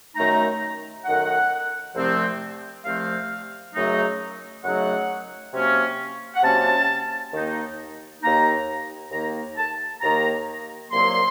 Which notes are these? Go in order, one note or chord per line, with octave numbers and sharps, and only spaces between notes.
F#2 D#3 A3 D#4 A#5
F#2 D#3 A3 D#4 F#5
C2 C3 F3 A3 C4
C2 C3 F3 A3 C4 F5
F#2 C#3 F#3 A3 D#4
F#2 C#3 F#3 A3 D#4 F#5
C3 F#3 A#3 C#4
F#5
C3 F#3 A#3 C#4 A5
D#2 D#3 A#3 D#4
D#2 D#3 A#3 D#4 A#5
D#2 D#3 A#3 D#4 A#5
A5
D#2 D#3 A#3 D#4 A#5
C2 A#2 F#3 A#3 C6